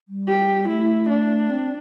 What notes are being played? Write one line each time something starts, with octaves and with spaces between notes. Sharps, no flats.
G3
G4
A3 E4
D4
C4